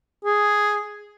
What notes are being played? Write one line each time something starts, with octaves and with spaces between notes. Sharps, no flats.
G#4